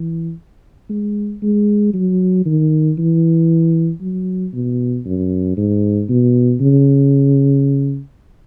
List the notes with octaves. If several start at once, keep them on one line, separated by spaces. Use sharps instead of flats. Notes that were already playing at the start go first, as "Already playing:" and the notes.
Already playing: E3
G#3
G#3
F#3
D#3
E3
F#3
B2
F#2
G#2
B2
C#3